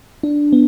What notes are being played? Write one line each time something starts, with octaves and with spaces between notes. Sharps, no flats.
D4
B3